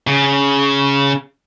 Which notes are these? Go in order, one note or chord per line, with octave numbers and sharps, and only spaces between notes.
C#3